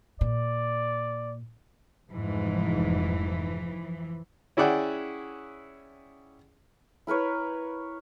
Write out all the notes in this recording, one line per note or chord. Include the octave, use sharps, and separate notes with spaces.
A#2 D5
F1 G#2 E3 F3
C#4 E4 G#4 D5 F#5 G5
E4 A#4 B4 C#5